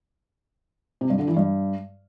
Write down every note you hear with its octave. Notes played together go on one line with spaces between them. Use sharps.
C3
G2
D3
E3
G2